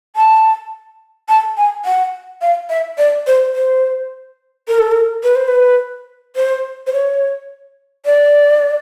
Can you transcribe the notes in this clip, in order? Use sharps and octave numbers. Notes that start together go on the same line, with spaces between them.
A5
A5
G#5
F#5
F5
E5
D5
C5
C5
A#4
A4
A#4
B4
C5
B4
C5
C5
C#5
D5